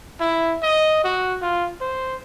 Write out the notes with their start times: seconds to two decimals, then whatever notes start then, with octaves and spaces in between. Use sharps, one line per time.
0.20 E4
0.63 D#5
1.04 F#4
1.42 F4
1.81 C5